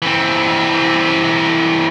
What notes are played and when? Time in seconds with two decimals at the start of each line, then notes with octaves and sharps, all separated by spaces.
0.02 E3 C4